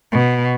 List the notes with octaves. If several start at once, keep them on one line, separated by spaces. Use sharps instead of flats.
B2